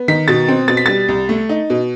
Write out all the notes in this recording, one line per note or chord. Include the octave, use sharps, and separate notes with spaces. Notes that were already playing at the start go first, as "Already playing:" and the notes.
Already playing: B3
D#3 B6
B2 A6
C4
B2 A6
B6
G3 A6
C2
A3
D#4
B2